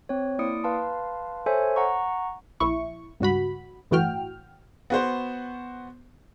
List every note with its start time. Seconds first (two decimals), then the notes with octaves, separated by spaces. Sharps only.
0.09 C4 C#5
0.39 A#3 E4 D5 D#6 C#7 D7
0.64 B4 F5 A5 C6
1.46 A4 C5 C#5 E5 G#5
1.76 F#5 A#5 C#6
2.60 A#1 E4 C#6
3.20 C#2 G2 F#4 B5
3.91 G1 A2 E3 F#4 G5 F6
4.90 B3 F#4 C5